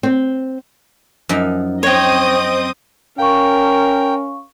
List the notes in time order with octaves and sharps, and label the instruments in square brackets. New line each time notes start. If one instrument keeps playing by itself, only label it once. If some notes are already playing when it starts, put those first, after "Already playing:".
[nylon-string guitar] C4
[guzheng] F#2 F3 D#4
[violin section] C4 D#5 D#6 [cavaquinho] C#5 G5
[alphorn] C#4 [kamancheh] A#4 [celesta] F5 C#6 [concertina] G5